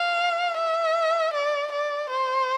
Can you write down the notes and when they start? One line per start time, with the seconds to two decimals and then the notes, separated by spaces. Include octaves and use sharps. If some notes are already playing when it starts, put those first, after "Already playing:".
Already playing: F5
0.57 E5
1.34 D5
1.72 D5
2.10 C5